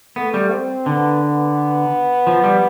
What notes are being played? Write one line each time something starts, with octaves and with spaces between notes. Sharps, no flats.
A3 B3
G3
C4
D3 B3
B3
F3
G3